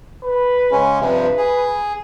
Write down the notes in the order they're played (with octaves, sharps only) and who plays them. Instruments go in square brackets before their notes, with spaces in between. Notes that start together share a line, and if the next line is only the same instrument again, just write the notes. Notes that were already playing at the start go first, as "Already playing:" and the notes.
[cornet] B4
[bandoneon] C#3 G#3 C#4
[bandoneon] G2 C3 F3 [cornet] B4
[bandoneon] G#4